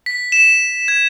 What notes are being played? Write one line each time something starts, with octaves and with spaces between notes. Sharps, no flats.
B6
E7
G#6